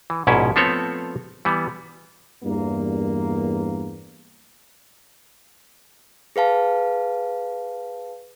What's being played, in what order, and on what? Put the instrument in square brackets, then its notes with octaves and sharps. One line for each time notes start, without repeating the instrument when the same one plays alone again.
[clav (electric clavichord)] E3
A#1 G#2 B2 C#4 E4
F3 A3 B3 C4 A4 C#5
E3 G3 B3
[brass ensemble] E2 G2 A#3
[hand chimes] G#4 B4 F5 A5